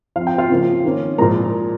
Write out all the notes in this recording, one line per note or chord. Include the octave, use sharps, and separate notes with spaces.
F3 C4 F5
G5
F4 F5
C#3 F3 A#3
D#3 A#3 C#4
A#2 F3 G#3 A#4 A#5